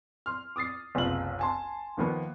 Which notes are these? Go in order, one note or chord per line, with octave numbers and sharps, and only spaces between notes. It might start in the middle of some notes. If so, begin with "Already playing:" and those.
C6 F6
D6 D#6 A6 C7
F#1 C2 B3 F4 F#7
G#5 A5 C6
D#2 D#3 F3 A#3 B3